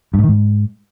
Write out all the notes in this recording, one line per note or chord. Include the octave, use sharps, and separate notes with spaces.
G2
G#2
D#3
G#2